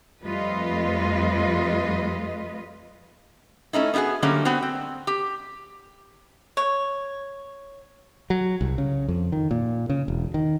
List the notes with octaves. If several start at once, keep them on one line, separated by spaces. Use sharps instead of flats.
F2 G3 A3 F4 B4 D#5
A3 C#4 D#4 E4
B3 D#4 F4 F#4 G#4
D3 F#3 G3 A3 A#3 C#4
B3 C4 F#4
C4
G4
C#5
F#3
C2
C#3
F2
D#3
A#2
C#3
E1
D#3